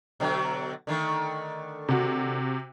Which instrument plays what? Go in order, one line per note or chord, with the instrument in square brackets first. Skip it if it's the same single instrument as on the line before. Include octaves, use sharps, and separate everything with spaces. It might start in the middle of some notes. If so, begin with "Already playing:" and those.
[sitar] B2 D3 F#3
D3 D#3 A3
[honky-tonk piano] C3 F#4